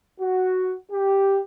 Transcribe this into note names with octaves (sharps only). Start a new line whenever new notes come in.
F#4
G4